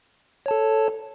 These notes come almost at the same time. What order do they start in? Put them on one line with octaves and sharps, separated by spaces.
C#5 A5 A4